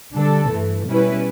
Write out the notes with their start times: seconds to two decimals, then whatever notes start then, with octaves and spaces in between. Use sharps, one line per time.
0.14 D3 G3 D4 A4
0.50 G2 E3 A3
0.87 B2 G3 C#4 E4 B4